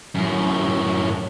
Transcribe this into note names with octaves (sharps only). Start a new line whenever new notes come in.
F#2 A2